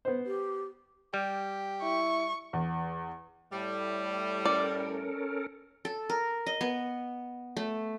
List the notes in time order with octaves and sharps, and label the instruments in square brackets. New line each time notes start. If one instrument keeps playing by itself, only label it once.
[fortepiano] B3 C5
[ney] G4
[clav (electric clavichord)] G3 [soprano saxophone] G4
[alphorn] E4 [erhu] C#6
[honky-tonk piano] E2
[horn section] A2 G3
[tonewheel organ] C#4 A4 A#4 [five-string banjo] D5
[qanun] A4
A#4
D#5
B3
A3